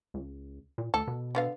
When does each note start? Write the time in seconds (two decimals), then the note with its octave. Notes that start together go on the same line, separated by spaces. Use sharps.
0.14 C#2
0.78 A#2
0.94 D2 A4
1.07 B2
1.35 D3 B3 F5